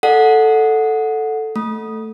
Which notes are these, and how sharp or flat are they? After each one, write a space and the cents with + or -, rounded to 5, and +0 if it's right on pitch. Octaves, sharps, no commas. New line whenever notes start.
A4 +0 D5 +45 F#5 -15
A3 +0 D#6 +0